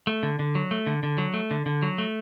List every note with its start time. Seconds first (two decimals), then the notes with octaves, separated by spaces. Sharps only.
0.07 A3
0.23 D3
0.39 D3
0.55 F#3
0.71 A3
0.87 D3
1.03 D3
1.18 F#3
1.34 A3
1.51 D3
1.66 D3
1.82 F#3
1.98 A3